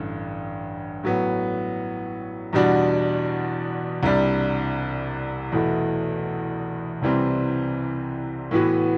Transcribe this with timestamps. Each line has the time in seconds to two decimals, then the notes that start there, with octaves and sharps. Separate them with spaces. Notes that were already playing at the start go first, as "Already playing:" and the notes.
Already playing: A1 G2 D3
1.04 A2 F#3 B3
2.53 E2 B2 G3 D4 F#4
4.03 C2 C3 G3 D4
5.52 E2 B2 A3 E4
7.02 C2 C3 E3 G3 C4
8.51 A2 E3 B3 F#4